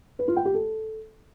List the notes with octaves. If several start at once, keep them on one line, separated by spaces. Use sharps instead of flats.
B4
F4
G5
G4
A4